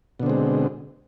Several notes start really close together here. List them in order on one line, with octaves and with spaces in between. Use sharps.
B2 D3 C4 G#3